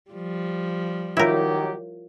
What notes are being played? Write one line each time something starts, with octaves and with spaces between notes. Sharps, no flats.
F3 G3
D#3 F#3 E4 F4 G4 A#4 C#5 F5